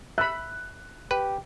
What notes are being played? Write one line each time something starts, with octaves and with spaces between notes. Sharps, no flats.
E5 B5 F#6
G4 B4